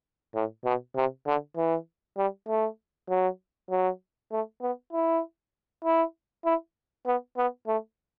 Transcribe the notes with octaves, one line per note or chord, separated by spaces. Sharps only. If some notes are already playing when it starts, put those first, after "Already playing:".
A2
B2
C3
D3
E3
G3
A3
F#3
F#3
A3
B3
E4
E4
E4
B3
B3
A3